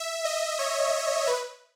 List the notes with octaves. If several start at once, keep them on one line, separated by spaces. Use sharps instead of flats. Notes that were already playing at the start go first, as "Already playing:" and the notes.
Already playing: E5
D#5
C#5
B4